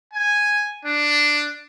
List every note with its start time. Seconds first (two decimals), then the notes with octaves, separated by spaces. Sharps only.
0.14 G#5
0.85 D4